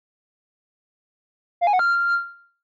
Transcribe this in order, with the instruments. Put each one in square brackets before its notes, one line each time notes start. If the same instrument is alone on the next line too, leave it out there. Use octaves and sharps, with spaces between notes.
[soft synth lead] F5
G#5
F#5
F6